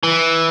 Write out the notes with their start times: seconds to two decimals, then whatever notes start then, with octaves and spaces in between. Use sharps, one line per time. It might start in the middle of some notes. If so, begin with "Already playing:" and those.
0.03 E3